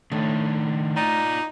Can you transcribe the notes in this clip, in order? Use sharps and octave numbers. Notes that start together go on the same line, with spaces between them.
A2 D#3 D4
D#4 F4 D5